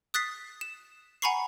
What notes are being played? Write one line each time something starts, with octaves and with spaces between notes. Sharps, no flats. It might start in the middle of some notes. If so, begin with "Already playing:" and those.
D#6 F#6 A6 B6 C7
E7
F#5 G#5 A#5 B5 C#6 C7